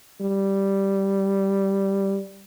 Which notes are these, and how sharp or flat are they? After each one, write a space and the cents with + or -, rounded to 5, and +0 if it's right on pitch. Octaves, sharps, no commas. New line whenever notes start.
G3 -5